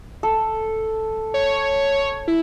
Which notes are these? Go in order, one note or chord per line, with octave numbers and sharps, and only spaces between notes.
A4
C#5
E4